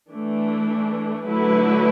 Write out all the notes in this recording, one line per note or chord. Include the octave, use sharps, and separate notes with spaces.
E3 A3 D4
D3 F#3 A3 E4 B4